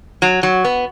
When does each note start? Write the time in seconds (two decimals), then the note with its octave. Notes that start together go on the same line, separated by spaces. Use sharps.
0.22 F#3
0.43 F#3
0.64 B3